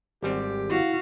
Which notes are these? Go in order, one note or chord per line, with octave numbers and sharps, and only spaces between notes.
G#1 G3 C4 G4
E4 F#4 F5